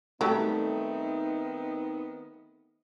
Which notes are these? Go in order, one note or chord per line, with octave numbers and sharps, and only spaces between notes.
D#3 F#3 G3 A3 B3 C4 D#4 G4